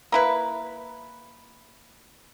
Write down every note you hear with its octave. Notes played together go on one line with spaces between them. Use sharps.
A#3 E4 B4